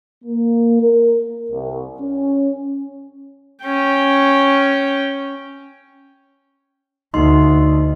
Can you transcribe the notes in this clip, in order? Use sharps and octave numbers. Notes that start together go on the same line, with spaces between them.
A#3
A#4
C2
C#4
C#4 G5
D2 D#4 D#5 C6